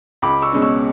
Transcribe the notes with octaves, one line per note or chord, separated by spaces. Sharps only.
C#2 B5 D6
C#6 E6
B2 G#3 C#4
C#6 E6